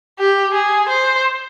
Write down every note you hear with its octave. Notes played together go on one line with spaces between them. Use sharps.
G4
G#4
C5